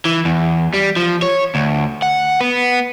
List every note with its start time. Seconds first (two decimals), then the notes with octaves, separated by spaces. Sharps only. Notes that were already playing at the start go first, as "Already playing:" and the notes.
0.05 E3
0.25 E2
0.74 G3
0.96 F3
1.22 C#5
1.55 D2
2.02 F#5
2.41 B3